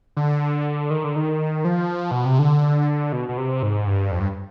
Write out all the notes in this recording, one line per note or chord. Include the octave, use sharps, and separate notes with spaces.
D3
D#3
D3
D#3
F3
B2
C3
D3
B2
B2
C3
G#2
G2
F2
G2